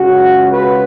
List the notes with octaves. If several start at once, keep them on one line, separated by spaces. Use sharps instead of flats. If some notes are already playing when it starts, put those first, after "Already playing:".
Already playing: C#2 C#3 G#3 C#4 F#4
F#4 B4